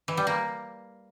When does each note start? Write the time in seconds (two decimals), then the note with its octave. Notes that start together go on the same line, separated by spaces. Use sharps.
0.08 E3
0.17 G3
0.27 A#3